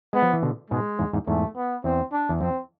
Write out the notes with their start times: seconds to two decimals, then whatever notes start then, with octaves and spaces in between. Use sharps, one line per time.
0.13 G#3 B3
0.22 F3
0.33 E3
0.42 B2 D3
0.70 G#2 B2 G#3
0.99 E2 G#2
1.13 E2 G#2
1.27 E2 G#2 A3
1.56 B3
1.84 E2 C4
2.12 D4
2.29 E2
2.40 F2 C4